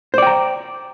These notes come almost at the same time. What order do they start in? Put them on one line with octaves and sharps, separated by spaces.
C5 D5 G5 A#5